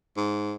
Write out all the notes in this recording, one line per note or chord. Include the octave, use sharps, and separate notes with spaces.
G#2